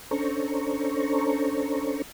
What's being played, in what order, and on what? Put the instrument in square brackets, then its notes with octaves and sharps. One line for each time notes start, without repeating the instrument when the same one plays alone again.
[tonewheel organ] C#4 D4 A4 C5 A#5 C#6